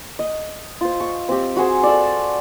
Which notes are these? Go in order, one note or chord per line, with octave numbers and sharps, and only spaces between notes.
D#5
F4 C5
C#6
C4 G4
F#4 G#4 C5
A4 D5